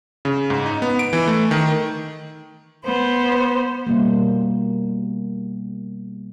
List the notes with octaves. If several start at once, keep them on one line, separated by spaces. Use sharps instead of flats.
C#3
G#2
D#4
B3
D7
E3
A3
D#3
B3 C5
B2 G3 A#3